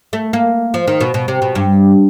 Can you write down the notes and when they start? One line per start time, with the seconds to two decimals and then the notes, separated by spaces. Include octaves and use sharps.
0.13 A3
0.33 A#3
0.74 F3
0.87 D#3
1.00 B2
1.14 B2
1.28 C3
1.42 B2
1.55 G2